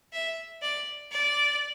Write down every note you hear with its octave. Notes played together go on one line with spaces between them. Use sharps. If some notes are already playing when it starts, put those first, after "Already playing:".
E5
D5
D5